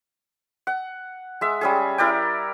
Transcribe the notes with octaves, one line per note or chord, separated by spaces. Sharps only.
F#5
G#3 E5
G3 C#4 G#4
E4 A#4 D5 G5